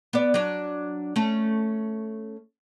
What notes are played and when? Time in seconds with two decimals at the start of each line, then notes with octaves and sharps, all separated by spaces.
0.13 B3 D5
0.34 F#3 D4
1.16 A3 C#4